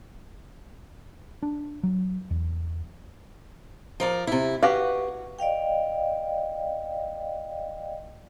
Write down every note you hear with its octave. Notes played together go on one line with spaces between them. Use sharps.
D4
F#3
E2
F3 A#4 D5
C3 E4
F#4 G4 B4 F5
D5 D#5 F5 G5